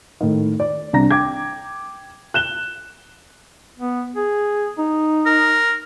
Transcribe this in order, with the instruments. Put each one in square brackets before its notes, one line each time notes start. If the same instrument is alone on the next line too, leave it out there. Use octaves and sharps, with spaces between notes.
[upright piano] A2 D#3
D5
C2 C3 D4 A#5 A#6
G5 D6 G#6
F#6 E7 G7
[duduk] B3
G#4
D#4
[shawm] A#4